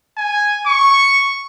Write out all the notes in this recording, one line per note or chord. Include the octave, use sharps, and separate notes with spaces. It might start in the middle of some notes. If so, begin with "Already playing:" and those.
G#5
C#6